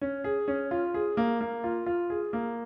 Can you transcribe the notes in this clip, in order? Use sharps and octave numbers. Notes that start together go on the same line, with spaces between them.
C#4
G#4
C#4
F4
G#4
A#3
A#3
F4
F4
G#4
A#3